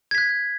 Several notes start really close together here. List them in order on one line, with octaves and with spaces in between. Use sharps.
G#6 B6 F#6